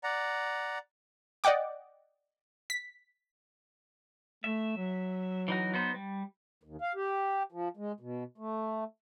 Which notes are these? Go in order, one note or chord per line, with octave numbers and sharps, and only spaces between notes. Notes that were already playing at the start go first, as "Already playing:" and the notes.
D5 F#5 A#5
D5 D#5 F#5 G5 D6
B6
A3 E5
F#3
E3 D#4 F#4
B3 D#4 C5
G3
D#2
F5
G4
F3
G#3
B2
A3